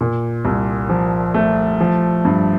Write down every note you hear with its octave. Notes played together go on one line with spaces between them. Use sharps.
A#2
C2
F3
A3
F3
G2